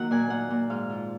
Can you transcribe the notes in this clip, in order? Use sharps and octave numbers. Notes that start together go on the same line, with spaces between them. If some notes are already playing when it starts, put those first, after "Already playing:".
Already playing: D#3 F#3 A#3 F#5
A#2 G#5
A#2 F#5
A#2
G#2 F5
F3